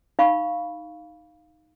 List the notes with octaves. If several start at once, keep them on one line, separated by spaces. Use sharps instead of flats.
D#4 F5 B5 C#6